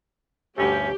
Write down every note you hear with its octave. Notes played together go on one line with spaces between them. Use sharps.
D2 G2 A3 C#4 G4